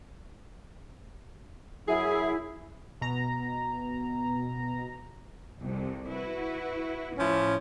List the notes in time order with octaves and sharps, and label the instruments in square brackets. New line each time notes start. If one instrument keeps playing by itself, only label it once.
[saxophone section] F#2 F#3 G#4 [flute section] E4
[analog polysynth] B2 A#5
[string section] C2 F2 C3
E4 F#4 B4
[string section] A2 [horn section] F3 C#4 E4